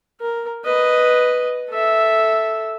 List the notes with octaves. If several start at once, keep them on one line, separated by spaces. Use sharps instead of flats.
A#4
B4 D#5
A4 E5